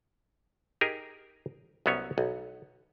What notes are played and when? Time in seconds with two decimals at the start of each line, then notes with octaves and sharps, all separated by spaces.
0.81 D#4 G4 G#4 A#4
1.86 C2 F#3 B3 C#4 C#5
2.18 B1